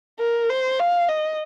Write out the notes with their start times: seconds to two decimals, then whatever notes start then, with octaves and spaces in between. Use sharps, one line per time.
0.19 A#4
0.50 C5
0.80 F5
1.09 D#5